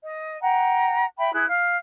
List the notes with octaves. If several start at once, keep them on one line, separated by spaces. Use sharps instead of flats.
D#5
F#5 G5 A#5
E5 G5 B5
E4 G#4 F#6
F5 F6